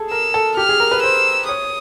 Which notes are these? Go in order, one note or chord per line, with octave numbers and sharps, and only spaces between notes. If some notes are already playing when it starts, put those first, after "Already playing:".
Already playing: G#4 A4
A#4 E6
A4
G4 F6
G#4
A#4
B4
C5 E6
C#5 D#6